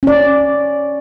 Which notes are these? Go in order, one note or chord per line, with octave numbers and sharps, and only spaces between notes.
C#4 D5